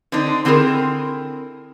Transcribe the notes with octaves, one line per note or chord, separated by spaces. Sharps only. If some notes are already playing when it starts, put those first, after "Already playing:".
D3 C4 D4 D#4
D3 C4 E4 G#4 A#4